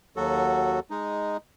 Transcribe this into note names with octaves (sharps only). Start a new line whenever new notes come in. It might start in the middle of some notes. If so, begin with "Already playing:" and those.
D#2 F#3 F#4 A4
G#3 D#4